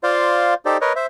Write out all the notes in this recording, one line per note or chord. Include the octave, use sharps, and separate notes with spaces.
F4 C5 D5 F5
D#4 G4 A4 C5 D5
A#4 B4 C#5 D#5
C5 E5